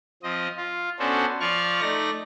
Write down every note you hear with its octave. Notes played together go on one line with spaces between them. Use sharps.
F3 C4 D#5
F4
B3 C#4 D4 F#4 A4 C5
F3 F4 D5 C#6 F6
A3 D#4 D5 A#6